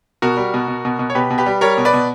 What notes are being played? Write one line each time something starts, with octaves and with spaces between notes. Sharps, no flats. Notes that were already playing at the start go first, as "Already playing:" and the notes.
B2 F#4 A#4
G3
B2
B2
B2
B2
C#5
B2 G4 B4
B2
G4 B4
G3
G3 A#4 C#5
B2
B4 D5
B2